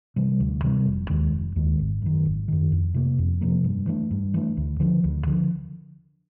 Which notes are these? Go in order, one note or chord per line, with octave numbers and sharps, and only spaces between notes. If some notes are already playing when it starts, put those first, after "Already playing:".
C3 E3 G3
D2
C3 E3 G3
F1
D#2 D#3 G#3
F1
D#2 D#3 G#3
G#1
F#2 D#3
G#1
F#2 D#3
F2
C3 F3 A#3
F2
C3 F3 A#3
G2
E3 A3 D4
G2
E3 A3 D4
D2
D3 F3
D2
D3 F3